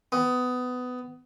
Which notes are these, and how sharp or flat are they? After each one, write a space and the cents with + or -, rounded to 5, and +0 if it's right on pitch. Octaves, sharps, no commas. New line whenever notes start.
B3 +20